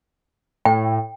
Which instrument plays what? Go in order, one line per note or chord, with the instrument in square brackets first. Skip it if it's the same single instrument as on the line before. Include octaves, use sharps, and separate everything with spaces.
[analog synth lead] A2 [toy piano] G5